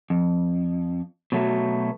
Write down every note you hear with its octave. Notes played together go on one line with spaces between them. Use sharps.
F2
B2 F#3 A3